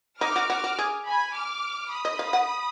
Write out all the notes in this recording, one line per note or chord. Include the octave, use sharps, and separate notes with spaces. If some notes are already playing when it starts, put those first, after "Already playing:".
D#4 D6 F6
F#4
F#4 D6 F6
F#4
G#4
G#5 B5
D6 F6
B5 D#6
D#5
F5
F#5